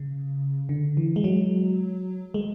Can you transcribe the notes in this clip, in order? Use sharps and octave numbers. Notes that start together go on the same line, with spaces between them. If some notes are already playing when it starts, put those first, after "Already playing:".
Already playing: C#3
D3
E3
G#3
F#3
G#3